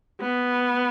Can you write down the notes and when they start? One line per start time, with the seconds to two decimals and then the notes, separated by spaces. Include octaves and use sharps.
0.20 B3